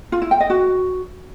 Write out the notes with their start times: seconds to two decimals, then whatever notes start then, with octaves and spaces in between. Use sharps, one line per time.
0.12 F4
0.22 E4
0.31 G5
0.40 D#5
0.50 F#4